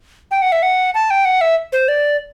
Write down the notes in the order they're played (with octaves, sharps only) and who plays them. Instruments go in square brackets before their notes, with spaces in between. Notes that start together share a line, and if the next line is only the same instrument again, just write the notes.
[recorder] G5
F#5
E5
F#5
A5
G5
F#5
E5
C5
D5